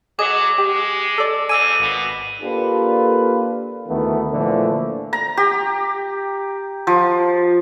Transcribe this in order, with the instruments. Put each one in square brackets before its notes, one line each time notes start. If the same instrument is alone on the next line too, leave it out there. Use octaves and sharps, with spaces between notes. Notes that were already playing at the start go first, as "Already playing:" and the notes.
[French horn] F#3 [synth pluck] G#4 D#5 [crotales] D6
[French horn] G#3 [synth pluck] G4
[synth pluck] A4 D5
[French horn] F2 [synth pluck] G#5 E6 [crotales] D#7
[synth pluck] G#1 [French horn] B2
[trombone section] A#3 D4 F4 G4 A4 B4
D2 D#3 E3 A3 B3
A#2 D3 E3 F3 A3
[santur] A#5
G4
F3